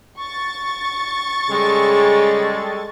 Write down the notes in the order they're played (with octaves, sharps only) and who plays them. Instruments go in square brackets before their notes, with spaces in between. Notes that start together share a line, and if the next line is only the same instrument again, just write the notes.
[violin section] C#6 A6
[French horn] C#3 [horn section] G3 G#3 A4